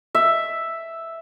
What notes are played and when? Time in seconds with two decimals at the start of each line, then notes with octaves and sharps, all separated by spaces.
0.15 E5